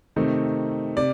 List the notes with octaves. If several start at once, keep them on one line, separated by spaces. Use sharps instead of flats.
C3 D#3 A3 C4 D#4
C3 D5